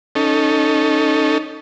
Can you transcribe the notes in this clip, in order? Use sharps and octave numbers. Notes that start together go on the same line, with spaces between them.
C#4 D#4 A4